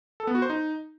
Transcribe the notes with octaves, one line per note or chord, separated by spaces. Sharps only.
A4
B3
F#4
C5
D#4